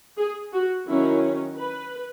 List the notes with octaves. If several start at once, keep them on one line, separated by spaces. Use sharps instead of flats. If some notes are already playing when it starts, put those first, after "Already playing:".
G#4
F#4
D#3 F#3 C#4 E4
B4